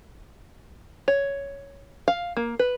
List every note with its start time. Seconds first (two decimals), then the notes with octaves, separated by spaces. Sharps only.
1.08 C#5
2.08 F5
2.37 A#3
2.59 B4